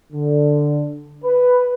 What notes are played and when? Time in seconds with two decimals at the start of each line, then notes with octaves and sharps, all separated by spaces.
0.13 D3
1.25 B4